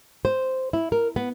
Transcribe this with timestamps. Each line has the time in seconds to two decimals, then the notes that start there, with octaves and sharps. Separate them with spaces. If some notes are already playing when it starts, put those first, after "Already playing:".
0.25 C5
0.73 E4
0.92 A#4
1.16 B3